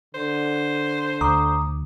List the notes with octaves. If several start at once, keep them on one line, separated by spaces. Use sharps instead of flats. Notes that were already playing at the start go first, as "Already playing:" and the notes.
D3 C5
D2 A#5 D6 D#6